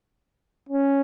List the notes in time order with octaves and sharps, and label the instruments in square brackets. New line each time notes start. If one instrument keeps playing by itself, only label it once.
[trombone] C#4